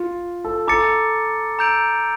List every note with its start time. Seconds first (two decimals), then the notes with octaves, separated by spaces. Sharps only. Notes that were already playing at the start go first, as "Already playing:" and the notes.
Already playing: F4
0.45 A4
0.68 A4 A#5 D6 A6 C#7
1.59 A#5 E6 G6 D7 F7